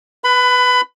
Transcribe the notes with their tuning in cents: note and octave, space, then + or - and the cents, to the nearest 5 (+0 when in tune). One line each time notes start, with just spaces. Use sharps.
B4 +0 B5 +25